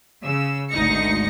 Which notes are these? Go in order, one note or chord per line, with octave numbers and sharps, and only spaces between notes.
C#3 E6
G#1 D2 G#2 D#4 A#6 C#7